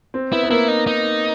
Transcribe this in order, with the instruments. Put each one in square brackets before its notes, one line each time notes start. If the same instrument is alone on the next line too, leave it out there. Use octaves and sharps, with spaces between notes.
[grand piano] C4
[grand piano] B3 [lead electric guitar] E4
[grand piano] B3
[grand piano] A#3 [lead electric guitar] E4
[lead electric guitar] D#4
D#4